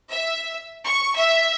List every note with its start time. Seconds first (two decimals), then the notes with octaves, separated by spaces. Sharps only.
0.12 E5
0.85 C#6
1.16 E5